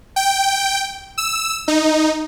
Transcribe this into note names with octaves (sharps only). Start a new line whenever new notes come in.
G5
E6
D#4